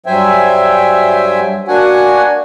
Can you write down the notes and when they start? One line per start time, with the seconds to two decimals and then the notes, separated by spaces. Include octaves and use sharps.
0.06 G2 F#3 C5 E5 G5 G#5
1.68 A#3 D4 F#4 F#5 G#5